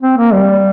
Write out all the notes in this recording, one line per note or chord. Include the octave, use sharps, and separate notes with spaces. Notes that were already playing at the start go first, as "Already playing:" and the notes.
C4
A#3
G3